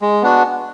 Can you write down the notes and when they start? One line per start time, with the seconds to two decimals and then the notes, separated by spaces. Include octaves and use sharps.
0.01 G#3
0.22 B3 D4 F#4